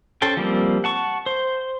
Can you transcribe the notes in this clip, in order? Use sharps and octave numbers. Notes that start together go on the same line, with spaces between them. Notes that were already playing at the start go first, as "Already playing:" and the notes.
C#4 A4 C5 G5
F3 G3 A#3 C4
F#5 A5 C#6
C5